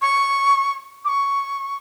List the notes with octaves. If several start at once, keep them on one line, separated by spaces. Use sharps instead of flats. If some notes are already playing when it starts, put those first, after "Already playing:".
C#6
D6
C#6